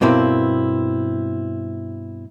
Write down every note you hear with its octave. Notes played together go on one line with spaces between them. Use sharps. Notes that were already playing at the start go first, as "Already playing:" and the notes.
G2 B2 A#3 C4 E4